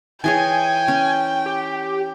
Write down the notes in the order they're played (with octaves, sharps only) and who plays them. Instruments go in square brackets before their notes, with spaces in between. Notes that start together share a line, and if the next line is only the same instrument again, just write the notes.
[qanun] E3 G#4 C#5 [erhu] G5 [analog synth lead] G#5
[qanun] C#4
[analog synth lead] G4